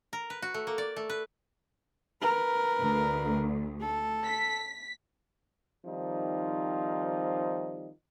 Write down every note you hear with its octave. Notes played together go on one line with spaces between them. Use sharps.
A#4
B4
F#4
A3
A#3
D5
A3
B4
A#4 B4
D2
A4
B6
D#3 F3 G3 C4 D#4